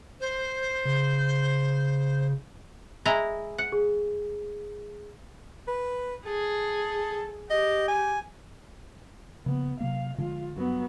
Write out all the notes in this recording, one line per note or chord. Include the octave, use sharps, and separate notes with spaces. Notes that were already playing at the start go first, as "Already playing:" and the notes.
C5
C#3
G#3 E4 A#5
F#5
G#4
B4
G#4 A4
G4 D#5
G#5
C#3 F3 A#3 B3
C3 F#3 A#3 F5
D3 F3 G#3 F4
G2 F#3 B3